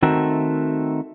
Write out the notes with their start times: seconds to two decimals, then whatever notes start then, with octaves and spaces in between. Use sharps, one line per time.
0.03 D#3 A3 C4 F#4 A#4 E5